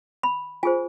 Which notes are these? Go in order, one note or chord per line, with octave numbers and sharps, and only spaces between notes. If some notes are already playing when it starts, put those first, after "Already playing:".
B5
F4 G#4 C5 G#5